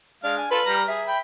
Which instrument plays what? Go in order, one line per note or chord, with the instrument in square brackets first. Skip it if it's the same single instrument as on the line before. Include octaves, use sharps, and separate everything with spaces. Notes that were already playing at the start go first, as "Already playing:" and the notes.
[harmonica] G#3 F5 [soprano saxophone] D4
[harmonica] G#5
[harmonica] F4 A4 [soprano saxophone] B4
[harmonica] G3 A#5 F6
[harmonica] G#4 [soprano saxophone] E5
[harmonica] G5 B5